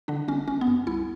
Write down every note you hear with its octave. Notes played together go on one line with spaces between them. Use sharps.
D3 D4
G1 C#4
G1 C#4
B3
F#2
C2 E4